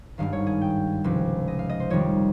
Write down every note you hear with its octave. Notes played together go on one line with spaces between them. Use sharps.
G#1 G2 D#3 F5
C#5
G#4
G5
C#2 C3 F3
D#5
F5
D#5
C5
F2 D#3 G3 C#5